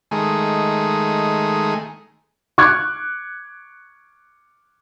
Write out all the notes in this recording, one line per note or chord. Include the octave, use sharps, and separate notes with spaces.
D#3 G#3 A3 G#4
C#6 D6 F#6 G#6